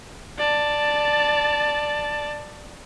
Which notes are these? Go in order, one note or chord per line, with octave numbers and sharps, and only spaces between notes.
D5 A5